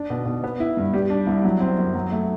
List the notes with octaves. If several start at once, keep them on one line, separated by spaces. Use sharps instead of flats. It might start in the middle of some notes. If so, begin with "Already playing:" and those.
Already playing: D4
B2
B2
B3
E4
G2
G3
D4
C2
F#3
C4
F#2
F#3
A3